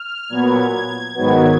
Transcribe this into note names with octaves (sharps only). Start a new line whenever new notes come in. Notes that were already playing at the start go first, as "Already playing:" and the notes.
Already playing: F6
A#2 F#3 B3 G#6
G#2 D#3 F#3 B3